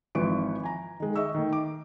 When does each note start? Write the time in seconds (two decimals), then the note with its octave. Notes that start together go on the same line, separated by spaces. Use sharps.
0.15 G#1 E3 F3 B4 C#6 D7
0.63 G#5 A#5
1.00 D#3 G#3
1.16 D#5 E5 C#6 E6
1.35 D#3 A3
1.53 D6